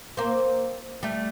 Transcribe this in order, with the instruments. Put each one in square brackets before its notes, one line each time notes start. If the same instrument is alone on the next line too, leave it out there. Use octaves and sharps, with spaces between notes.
[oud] A#3 C4
G3 A3